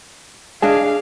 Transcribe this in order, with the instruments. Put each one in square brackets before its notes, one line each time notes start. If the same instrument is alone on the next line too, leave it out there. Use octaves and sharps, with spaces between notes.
[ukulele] D4 D#5 A5 [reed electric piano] G#4 [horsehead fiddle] F5